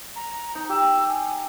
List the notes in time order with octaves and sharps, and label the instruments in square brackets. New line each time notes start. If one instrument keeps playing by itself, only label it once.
[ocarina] A#5
[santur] D#4
[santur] G4 [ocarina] E6
[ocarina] G#5